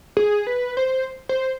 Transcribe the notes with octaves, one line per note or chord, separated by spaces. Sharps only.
G#4
B4
C5
C5